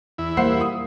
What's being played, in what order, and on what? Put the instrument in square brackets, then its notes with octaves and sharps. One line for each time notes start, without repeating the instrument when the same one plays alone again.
[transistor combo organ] E2 E4
[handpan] G3 A#3 [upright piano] C5 F#5 C7
[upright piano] D#6